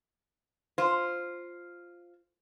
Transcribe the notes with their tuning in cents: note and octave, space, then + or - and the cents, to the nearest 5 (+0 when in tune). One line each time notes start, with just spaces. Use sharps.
F4 +0 C5 +0